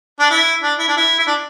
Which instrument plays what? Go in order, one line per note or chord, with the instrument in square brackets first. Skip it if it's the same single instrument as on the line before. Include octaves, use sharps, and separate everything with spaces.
[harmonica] D4
E4
D4
E4
D4
E4
E4
D4